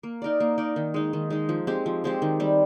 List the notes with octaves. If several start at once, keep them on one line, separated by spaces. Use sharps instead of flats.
A#3
D#4 A#4 D5
A#3
D#4 A#4 D5
D#3
G#3 D#4
D#3
G#3 D#4
F3
G#3 C4 G4
F3
G#3 C4 G4
D#3
G3 C4